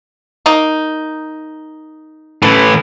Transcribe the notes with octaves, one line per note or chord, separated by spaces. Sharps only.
A#3 D#4
A2 E3 A4 B4